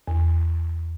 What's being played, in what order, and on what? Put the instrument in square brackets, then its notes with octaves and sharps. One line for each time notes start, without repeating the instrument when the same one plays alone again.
[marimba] E2